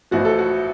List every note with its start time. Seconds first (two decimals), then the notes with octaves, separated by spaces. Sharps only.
0.11 A1 A2 F3 F#4
0.25 A4
0.39 F#4